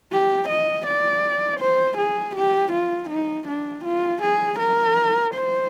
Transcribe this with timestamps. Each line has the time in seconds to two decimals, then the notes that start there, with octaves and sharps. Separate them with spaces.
0.12 G4
0.49 D#5
0.87 D5
1.60 C5
1.98 G#4
2.36 G4
2.73 F4
3.10 D#4
3.48 D4
3.85 F4
4.22 G#4
4.59 A#4
5.35 C5